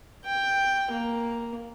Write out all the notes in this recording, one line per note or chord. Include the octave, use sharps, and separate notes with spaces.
G5
A#3